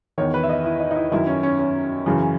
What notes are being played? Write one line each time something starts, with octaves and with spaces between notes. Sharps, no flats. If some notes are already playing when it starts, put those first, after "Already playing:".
E2 D#3 C#5
B4
E5
D#5
E4
D#4
D#4
E4
F#2 D#3 E4
C#4
C#4
C#4
F#2 C#3 E3